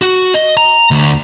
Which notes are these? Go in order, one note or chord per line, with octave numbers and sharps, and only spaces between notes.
F#4
D#5
A#5
D2